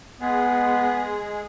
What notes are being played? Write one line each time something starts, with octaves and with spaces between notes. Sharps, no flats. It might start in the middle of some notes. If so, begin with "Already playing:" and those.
G#3 B3 G#4